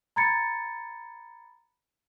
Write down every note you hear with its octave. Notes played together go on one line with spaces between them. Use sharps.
A#5 B5 G#6 A6 C#7